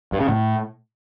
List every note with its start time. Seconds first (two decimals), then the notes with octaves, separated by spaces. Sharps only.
0.12 G2
0.20 C#3
0.28 A2